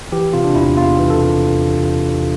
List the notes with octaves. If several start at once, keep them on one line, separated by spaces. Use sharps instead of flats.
E3 G4
C3 F4
D4
E2 E4
E2 F4
E3
A4
C3